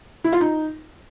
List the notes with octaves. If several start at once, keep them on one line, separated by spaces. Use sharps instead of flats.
E4
F4
D#4